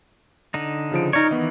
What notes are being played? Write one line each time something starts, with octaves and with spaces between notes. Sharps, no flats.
D3 D#4
C#3 F3 D7
D#4 A#4 C#5 D5
D#3 E3 B3 D#5